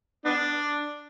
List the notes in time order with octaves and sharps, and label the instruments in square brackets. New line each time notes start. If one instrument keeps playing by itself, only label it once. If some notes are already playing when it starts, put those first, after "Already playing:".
[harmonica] B3 D4